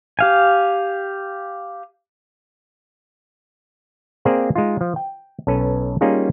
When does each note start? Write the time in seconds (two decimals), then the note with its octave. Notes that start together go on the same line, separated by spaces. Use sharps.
0.19 G4 F5 G#5
4.25 A#3 C4 G#4 A#4 C5 D5
4.56 G#3 D#4 F4
4.81 F3
4.96 G5
5.47 B1 C#4 A4 B4
6.01 G3 A#3 C#4 D#4 F4 G#4